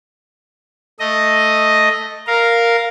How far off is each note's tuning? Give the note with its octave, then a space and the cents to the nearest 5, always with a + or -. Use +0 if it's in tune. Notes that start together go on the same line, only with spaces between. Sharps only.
A3 +0 D#5 +0
A#4 +0 F5 +0